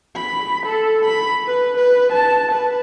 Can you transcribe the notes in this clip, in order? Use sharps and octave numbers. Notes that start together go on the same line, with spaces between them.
B5
A4
B5
B4
B4
A5
B4